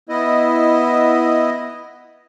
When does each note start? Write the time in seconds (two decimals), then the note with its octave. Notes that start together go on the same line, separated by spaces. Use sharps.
0.09 B3 E4 D#5